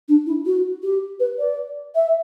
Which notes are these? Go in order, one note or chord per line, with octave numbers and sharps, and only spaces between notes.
D4
E4
F#4
G4
B4
D5
E5